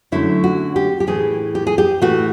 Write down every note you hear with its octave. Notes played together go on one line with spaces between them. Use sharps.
F#2 D3 F#3 A3 E4
F#4
G4
G4
A2 E3 A3 G#4
G4
G#4
G4
A2 E3 A3 F#4